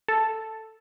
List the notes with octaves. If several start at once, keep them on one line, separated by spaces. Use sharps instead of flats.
A4